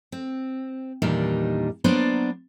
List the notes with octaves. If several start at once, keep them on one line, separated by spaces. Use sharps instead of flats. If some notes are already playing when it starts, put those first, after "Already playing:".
C4
E2 A#2 D#3 G3 D4 D#4
F#3 A#3 B3 D4 C5 D5